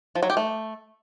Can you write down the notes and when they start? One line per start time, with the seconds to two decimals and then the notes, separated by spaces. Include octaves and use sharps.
0.15 F3
0.23 F#3
0.30 G4
0.37 A3